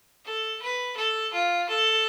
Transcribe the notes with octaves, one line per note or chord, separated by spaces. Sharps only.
A4
B4
A4
F4
A4